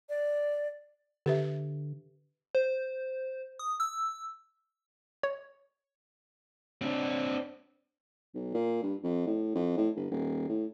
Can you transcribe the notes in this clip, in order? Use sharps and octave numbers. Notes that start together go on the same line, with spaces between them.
D5
D3 G4 B4 E5
C5
D#6
E6
C#5
C4 D4
B1
A#2
G2
F2
A2
F2
A2
G1
D#1
A2